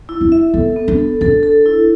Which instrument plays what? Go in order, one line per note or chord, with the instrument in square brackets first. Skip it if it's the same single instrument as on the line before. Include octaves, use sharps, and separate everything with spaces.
[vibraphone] E4
[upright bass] D4
[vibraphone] E5
[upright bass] B3 [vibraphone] A4
[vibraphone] B3
[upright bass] D4
[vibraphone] A4
[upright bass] D4 [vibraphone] A4
[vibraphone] A4
E4